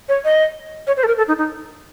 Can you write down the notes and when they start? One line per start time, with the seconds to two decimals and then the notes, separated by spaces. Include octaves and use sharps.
0.08 C#5
0.25 D#5
0.87 C#5
0.97 C5
1.03 A4
1.07 A#4
1.17 A4
1.28 D#4
1.38 D#4